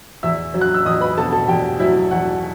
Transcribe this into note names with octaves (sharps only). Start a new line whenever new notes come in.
E2 E5 E6
F#3
F#6
E6
E2 D#5 D#6
B4 B5
B2 A4 A5
A4 A5
E2 G4 G5
F#3 E4 E5
E2 F#4 F#5